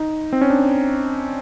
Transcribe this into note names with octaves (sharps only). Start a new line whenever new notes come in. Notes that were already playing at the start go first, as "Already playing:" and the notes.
Already playing: D#4
C4
C#4
D4